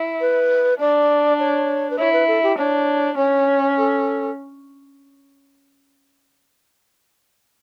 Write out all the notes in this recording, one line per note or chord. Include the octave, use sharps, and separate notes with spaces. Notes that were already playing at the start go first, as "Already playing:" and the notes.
Already playing: E4
B4
D4 D5
C#5
B4
E4 C#5
B4
A4
G4
D4 C#5
C#4 C#5
A4